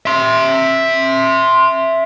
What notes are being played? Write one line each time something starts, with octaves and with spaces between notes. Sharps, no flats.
E5 C6